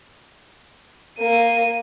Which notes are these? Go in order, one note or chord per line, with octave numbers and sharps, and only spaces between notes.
A#3 D#7